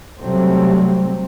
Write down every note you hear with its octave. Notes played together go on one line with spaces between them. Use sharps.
C3 F#3 G3 A3 C4